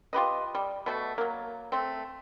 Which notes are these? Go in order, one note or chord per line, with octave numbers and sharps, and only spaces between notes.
F4 G4 B4 D#5
G3
B2 A3 F#4
F#3 A#3
A3 C4